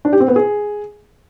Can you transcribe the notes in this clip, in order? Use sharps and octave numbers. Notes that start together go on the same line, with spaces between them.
D4
G4
C4
B3
G#4